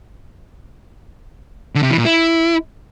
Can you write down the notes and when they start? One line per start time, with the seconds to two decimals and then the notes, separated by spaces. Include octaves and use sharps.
1.75 D3
1.83 C3
1.90 E3
1.98 A#2
2.05 E4